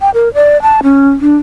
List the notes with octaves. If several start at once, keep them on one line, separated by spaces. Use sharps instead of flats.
G5
A#4
D5
A5
C#4
D4